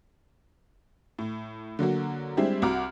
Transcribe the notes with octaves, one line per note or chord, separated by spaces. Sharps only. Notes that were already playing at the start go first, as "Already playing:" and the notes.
A2
D3 F#3 A#3 F#4
G3 G#3 C4 D4 E4 G4
C2 F#4 F#5 A#5 D6 F6